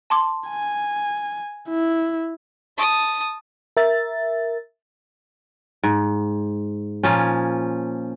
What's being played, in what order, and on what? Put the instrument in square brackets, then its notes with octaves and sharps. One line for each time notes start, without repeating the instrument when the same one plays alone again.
[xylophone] A5 C6 D6
[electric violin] G#5
E4
[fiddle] A5 D#6
[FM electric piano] A#4 E5 A6
[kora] G#2
A#2 F3 C#4